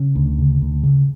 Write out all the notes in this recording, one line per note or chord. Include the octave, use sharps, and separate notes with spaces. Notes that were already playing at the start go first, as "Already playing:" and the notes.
Already playing: C#3 C#4
D2
C#3
D2
C#3